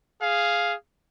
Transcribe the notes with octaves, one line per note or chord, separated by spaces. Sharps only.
G#4 F5